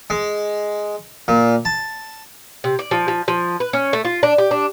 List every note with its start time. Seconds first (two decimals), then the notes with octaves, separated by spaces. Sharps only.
0.10 G#3
1.28 A#2
1.65 A5
2.64 C3
2.79 D5
2.91 F3
3.08 F3
3.28 F3
3.60 B4
3.73 C#4
3.93 A3
4.05 F4
4.23 D4
4.38 G4
4.51 D4